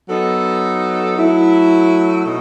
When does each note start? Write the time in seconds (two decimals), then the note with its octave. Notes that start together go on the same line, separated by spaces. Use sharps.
0.07 F#3 B3 D#4 A4
1.16 F#3 A3 E4
2.25 B2 A3 D#4